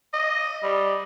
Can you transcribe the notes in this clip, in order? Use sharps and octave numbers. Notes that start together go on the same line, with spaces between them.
D#5
G3